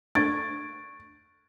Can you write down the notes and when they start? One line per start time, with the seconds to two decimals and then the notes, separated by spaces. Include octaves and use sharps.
0.15 A3 D4 C#6 G#6 A6 D7